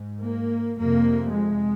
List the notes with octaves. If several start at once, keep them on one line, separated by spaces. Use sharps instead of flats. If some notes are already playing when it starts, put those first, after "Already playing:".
Already playing: G#2
A#3
F2 C3 A#3
G#3